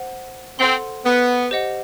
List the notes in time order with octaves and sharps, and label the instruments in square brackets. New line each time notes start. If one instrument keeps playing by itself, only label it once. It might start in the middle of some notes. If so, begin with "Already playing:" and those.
Already playing: [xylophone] C5 F#5
[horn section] C4 [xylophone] A4 C5 F#5 C6
[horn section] B3
[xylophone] G4 C5 D#5 F#5